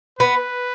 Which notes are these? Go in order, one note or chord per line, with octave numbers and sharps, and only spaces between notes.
B3 B4